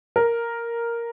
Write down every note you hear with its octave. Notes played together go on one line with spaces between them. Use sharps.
A#4